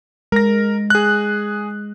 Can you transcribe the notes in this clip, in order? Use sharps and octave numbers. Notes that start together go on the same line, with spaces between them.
G#3 A#4 A#6
G#4 F#6